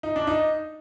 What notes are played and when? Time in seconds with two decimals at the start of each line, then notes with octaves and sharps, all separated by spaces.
0.03 D#4
0.16 D4
0.27 D#4